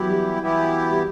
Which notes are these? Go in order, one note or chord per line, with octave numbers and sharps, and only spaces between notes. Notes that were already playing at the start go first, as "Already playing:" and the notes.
Already playing: E3 F#3 B3 E4 G4
G3
E3 B3 E4 G4
G3